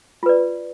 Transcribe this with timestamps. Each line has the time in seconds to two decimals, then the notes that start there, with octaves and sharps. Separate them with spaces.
0.23 F4
0.26 B4
0.29 D5